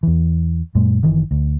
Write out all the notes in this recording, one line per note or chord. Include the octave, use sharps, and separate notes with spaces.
E2 E3
F#2 A#2 G#3
F#1 D#3 E3
D2